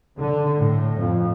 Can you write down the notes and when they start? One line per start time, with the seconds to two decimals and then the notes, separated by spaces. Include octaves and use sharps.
0.18 D3
0.60 A2
0.99 F2